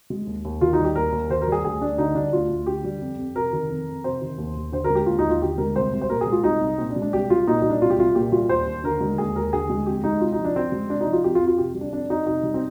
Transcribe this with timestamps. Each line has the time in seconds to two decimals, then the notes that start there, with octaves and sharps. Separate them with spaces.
0.10 G#3
0.27 D#2
0.45 D#2
0.61 D#3 F4
0.73 D#4
0.79 G3
0.84 G4
0.95 D#2 A#4
1.12 D#2
1.29 D#3 C5
1.42 A#4
1.48 G3 G#4
1.64 D2 G#4
1.81 D2 D4
1.98 D3 D#4
2.15 G3 D4
2.33 D2 F4
2.50 D2
2.67 D3 G4
2.85 G3
3.01 F2
3.18 F2
3.36 C3 A#4
3.53 D#3
3.70 F2
3.87 F2
4.04 C3 C5
4.22 D#3
4.38 D#2
4.56 D#2
4.72 D3 C5
4.84 A#4
4.90 G#3
4.95 G4
5.06 D#2 F4
5.19 D#4
5.24 D#2
5.30 F4
5.42 D3 G4
5.58 G#3 A#4
5.76 C2 C5
5.93 C2
6.02 C5
6.10 A#2 A#4
6.21 G#4
6.27 G#3
6.32 F4
6.44 C2 D#4
6.61 C2
6.78 A#2 C4
6.90 D4
6.96 G#3
7.02 D4
7.13 C2 G4
7.30 C2 F4
7.47 A#2 D#4
7.62 G3 D#4
7.70 D4
7.82 C2 F4
7.90 G4
7.98 C2 F4
8.15 A#2 G4
8.32 G3 F4
8.49 D#2 C5
8.66 D#2
8.84 D3 A#4
9.01 G#3
9.18 D#2 G#4
9.35 D#2 A#4
9.53 D3 G#4
9.70 G#3
9.86 F2 G4
10.04 G#3 D#4
10.21 C3 F4
10.32 D#4
10.39 F3
10.45 D4
10.56 F2 C4
10.72 G#3
10.90 C3 D4
11.01 D#4
11.07 F3
11.13 F4
11.24 F2 G4
11.35 F4
11.41 F2
11.47 F4
11.58 C3 G4
11.75 G3
11.81 D4
11.92 F2 D4
12.09 F2 D#4
12.27 C3 D#4
12.43 G3
12.54 C4